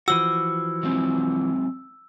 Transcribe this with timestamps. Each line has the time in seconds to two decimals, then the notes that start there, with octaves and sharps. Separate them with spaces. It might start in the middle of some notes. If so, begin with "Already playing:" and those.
0.08 E3 F3 F#4 E6
0.83 F#3 G#3 C4